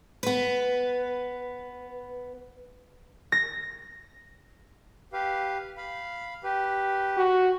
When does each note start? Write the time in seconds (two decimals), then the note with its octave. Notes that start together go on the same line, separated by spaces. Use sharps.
0.23 B3 B4
3.32 A#6
5.13 G4 B4 F5
5.77 F5 B5
6.44 G4 B4
7.17 F#4